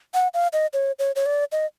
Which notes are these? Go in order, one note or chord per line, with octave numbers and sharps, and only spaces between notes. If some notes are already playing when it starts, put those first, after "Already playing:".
F#5
F5
D#5
C#5
C#5
C#5
D5
D#5